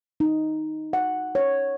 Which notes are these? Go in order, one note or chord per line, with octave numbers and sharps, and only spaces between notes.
D#4
F#5
C#5